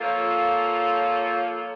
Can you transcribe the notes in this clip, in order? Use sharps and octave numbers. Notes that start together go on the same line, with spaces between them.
F3 A#3 F4 A4 C#5